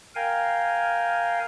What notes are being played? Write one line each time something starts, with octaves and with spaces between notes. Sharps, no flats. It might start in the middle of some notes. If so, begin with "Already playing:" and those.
A#4 F5 G5 G#5